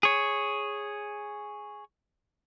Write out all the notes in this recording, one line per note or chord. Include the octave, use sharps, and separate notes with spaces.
G#4 C#5